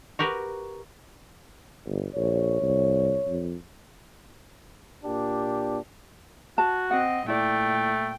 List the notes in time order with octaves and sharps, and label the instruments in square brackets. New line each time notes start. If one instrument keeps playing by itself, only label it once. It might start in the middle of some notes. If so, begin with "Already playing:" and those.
[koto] F#4 G4 A#4 B4
[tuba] G1
[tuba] A#1 [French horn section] C#5
[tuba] C2
F2
[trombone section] A#2 D4 G4
[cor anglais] F#4 [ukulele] A5
[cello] C4 D#5 [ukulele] F#5
[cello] A#2 G5 [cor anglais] A3 [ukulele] E4 D5